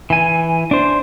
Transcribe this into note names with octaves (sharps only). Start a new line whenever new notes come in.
E3 G#5
D4 C5